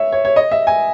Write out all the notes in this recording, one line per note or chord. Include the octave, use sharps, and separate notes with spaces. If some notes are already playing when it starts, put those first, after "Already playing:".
Already playing: C#5 E5
C#5
C#5
D#5
E5
G#5